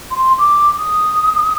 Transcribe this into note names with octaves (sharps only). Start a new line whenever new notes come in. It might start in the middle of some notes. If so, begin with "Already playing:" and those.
C6
D6
D#6